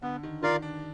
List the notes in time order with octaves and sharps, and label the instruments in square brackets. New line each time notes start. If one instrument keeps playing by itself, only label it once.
[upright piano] D3 [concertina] B3
[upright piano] D#3
[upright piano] D#3 [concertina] F4 A#4 D5 F5
[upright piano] D4